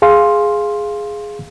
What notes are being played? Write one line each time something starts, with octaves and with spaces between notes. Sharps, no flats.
G#4 F5 C6